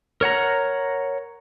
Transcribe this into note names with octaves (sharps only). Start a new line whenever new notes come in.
A#4 C#5 F#5 A#5